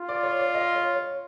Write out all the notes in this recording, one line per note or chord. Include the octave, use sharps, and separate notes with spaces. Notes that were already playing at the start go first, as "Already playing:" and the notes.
Already playing: F4
D5
C#5
D5
D#5
C#5
C#5